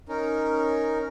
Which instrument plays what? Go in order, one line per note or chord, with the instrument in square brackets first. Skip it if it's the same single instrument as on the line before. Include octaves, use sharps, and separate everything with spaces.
[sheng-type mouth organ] C#4 D#4 A#4